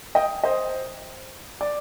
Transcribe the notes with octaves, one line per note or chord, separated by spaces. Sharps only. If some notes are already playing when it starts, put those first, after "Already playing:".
D#5 G5
C5 D#5
D5